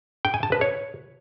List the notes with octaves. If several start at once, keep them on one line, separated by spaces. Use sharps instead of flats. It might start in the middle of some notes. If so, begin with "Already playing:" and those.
G5
G#5
A5
B4
C#5